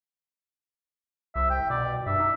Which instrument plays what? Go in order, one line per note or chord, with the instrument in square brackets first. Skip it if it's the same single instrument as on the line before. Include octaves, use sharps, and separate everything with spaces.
[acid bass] C2 [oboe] E5
[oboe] G5
[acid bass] B2 [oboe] D5
[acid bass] G2 [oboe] E5
[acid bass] D#4